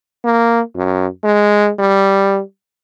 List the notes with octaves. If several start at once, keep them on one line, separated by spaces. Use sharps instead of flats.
A#3
F#2
G#3
G3